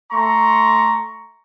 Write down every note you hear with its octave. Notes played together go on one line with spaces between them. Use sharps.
A3 A#5 C6 C#6